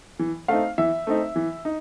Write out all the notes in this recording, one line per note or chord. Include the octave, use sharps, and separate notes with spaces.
E3
A3 C4 D#4 F5
E3 E5
A3 C4 D#4
E3
D#4